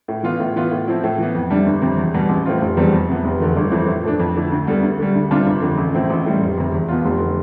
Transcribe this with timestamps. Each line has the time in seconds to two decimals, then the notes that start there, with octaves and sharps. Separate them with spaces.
0.08 A2
0.23 E3 B3 F4
0.40 A2
0.56 E3 B3 F4
0.72 A2
0.88 F3 C4 E4
1.04 A2
1.18 E3 B3
1.35 F2
1.50 C3 G3 D4
1.66 G1
1.82 F2 C3
1.98 E2
2.14 B2 G3
2.29 A1
2.46 A2 F3 C4 F4
2.62 F1
2.77 E2 B2 G3 C4
2.92 F2
3.09 C3 F3 B3
3.24 F1
3.40 E2 D3 A3
3.57 G1
3.72 F2 E3 A3 C4
3.88 A2
4.04 F3 A3 D4
4.20 F2
4.35 D3 A3 E4
4.52 D2
4.67 D3 G3 B3
4.83 D2
4.99 D3 G3
5.15 D2
5.31 C3 G3 D4 F4
5.46 G1
5.62 F2 D3
5.78 A1
5.94 A2 F3 C4 E4
6.10 A1
6.26 A2 G3
6.41 F1
6.57 F2 C3
6.72 E2
6.88 B2 B3 F4
7.05 F1
7.20 D3